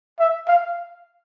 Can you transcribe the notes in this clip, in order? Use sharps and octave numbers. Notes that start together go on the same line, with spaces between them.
E5
F5